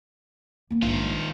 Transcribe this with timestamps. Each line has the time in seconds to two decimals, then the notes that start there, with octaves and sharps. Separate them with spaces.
0.70 A#3 B3
0.82 A#1 G#2 D#3 F4